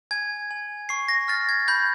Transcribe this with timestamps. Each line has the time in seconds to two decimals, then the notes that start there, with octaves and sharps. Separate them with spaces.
0.11 G#5 G#6
0.51 G#5
0.89 C#6 C7
1.08 A#6
1.28 F6 A6
1.49 G#6
1.68 B5 G6